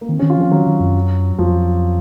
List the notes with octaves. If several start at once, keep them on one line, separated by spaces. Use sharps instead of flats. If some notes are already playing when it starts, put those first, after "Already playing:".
A#3
D#3 C4
D#3 C#4
F4
F3 C#4
D#3 F#3
D#3
F#2
F2 F3